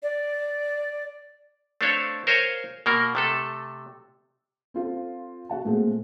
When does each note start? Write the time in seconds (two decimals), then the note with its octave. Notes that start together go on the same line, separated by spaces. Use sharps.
0.03 D5
1.81 A3 C4 D4 A4 C#5 F5
2.27 A#4 C5 C#5 F5 G#5
2.86 B2 A#3 A#4
3.15 C3 A3 A4
4.74 C4 F4 A4
5.49 F#4 F#5 A5
5.64 A#2 G#3 A3 C4